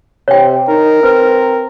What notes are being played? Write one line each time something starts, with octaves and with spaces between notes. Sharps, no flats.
C3 C#5 G5
D#4 A#4
C4 B4